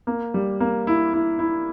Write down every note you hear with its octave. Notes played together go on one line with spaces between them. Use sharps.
A#3
G3
A#3
E4
E4
E4